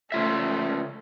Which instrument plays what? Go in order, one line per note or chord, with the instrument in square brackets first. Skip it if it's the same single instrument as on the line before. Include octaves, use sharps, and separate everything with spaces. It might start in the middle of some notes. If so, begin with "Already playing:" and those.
[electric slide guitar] C#3 F4 E5 [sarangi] A3